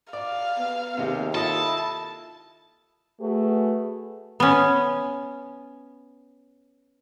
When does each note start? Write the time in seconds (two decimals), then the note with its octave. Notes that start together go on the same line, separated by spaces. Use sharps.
0.13 D5 F5
0.58 B3
0.97 D#2 C3 G#3 G4
1.35 E4 F4 A4 D#5 A5
3.21 A3 F#4 G#4 B4
4.40 B3 C#4